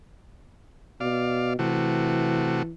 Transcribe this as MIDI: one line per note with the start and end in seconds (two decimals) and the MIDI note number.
1.00 1.56 47
1.00 1.53 74
1.00 1.53 77
1.59 2.63 48
1.59 2.72 52
1.59 2.63 57
1.59 2.63 66